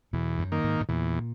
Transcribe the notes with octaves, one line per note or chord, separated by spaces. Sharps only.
E2 B2
F#2
D#3 A#3
G#2
G#2
E2 A#2